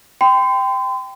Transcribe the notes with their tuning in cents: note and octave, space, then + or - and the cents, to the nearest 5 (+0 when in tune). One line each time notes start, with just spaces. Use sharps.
G5 +0 C6 -40